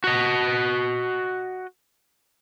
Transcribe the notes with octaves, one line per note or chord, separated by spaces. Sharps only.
F#4 D#5